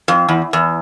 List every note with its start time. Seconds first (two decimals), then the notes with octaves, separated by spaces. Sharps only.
0.08 F2
0.29 E2
0.53 E2